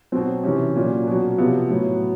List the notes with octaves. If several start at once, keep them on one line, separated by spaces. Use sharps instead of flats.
B2 F#3 C4
C3 E3 C#4
A#2 F#3
B2 F#3
C3 F3 B3
A2 F#3